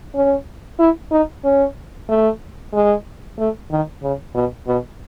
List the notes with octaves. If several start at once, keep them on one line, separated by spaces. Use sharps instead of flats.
C#4
E4
D#4
C#4
A3
G#3
A3
D#3
C#3
B2
B2